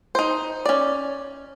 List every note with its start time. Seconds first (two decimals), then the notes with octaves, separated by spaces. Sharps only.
0.15 D#4 C5
0.66 C#4 D5